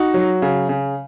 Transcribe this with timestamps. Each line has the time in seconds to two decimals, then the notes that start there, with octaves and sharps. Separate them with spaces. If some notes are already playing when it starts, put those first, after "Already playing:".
Already playing: D#4 F#4
0.14 F#3
0.42 C#3
0.69 C#3